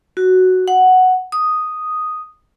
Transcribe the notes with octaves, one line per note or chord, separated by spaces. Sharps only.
F#4
F#5
D#6